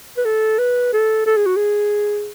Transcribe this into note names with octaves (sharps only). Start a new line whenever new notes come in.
B4
A4
B4
A4
A4
G#4
F#4
G#4